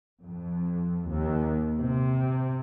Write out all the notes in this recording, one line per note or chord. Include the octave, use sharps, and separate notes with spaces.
F2
D#2
C3